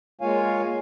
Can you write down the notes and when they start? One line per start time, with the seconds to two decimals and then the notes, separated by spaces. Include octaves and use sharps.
0.21 G#3 A#3 F4 C#5 F5 G#5